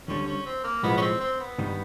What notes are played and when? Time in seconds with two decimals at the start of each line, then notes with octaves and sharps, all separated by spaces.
0.08 D2 D3 G3 C#4
0.27 C#4
0.46 C4
0.64 A#3
0.83 B1 A2 F3 G#3 B3
0.97 C#4
1.01 C4
1.20 C4
1.40 B3
1.58 G2 D#3 G3